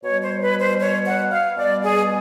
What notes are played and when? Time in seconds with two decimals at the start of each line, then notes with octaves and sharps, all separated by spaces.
0.04 B2 G3 C#5
0.22 C5
0.42 B4
0.61 C5
0.80 C#5
1.06 F#5
1.31 F5
1.57 B2 G3 D5
1.83 G#4